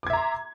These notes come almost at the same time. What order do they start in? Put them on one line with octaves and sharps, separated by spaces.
D6 G#6 E5 A#5 C6